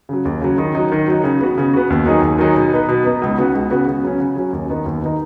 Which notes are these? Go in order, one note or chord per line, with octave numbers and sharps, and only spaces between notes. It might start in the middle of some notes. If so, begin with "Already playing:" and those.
C#3 F#3
D#2
C#3 F#3
D#3
F#3 D#4
D#3
F#3 D#4
C#3
B3 F#4
C#3
B3 F#4
D#2
D#3 F#3 D#4 G#4
D#2
D#3 F#3 D#4 G#4
B2
B3 D#4 B4
B2
B3 D#4 B4
C#2
C#3 B3 F#4
C#2
C#3 B3 F#4
C#3
F#3 C#4
C#3
F#3 C#4
D#2
D#3 B3 D#4
D#2
D#3 B3 D#4